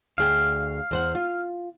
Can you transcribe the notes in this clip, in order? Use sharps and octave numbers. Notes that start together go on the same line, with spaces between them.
D2 G#4 F5 G5
E2 C5 F#5
F4